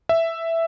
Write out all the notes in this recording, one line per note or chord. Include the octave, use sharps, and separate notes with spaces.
E5